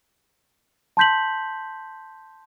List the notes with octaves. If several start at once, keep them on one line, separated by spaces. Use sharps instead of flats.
A5 C6 G6 B6 F#7